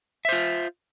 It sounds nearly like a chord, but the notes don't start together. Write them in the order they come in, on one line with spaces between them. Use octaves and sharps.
E5 C5 F4